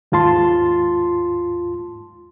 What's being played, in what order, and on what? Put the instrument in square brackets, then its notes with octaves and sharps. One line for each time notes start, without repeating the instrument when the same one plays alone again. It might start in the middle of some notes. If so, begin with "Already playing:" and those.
[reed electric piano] D#2 G#2 F4 A5 C6